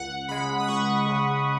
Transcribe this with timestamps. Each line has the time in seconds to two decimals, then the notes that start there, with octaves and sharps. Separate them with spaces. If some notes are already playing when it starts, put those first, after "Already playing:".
Already playing: C#2 F#5
0.28 C#3 G#3 B5
0.59 D#6
0.68 C#2 C#6
1.06 C#3 G#3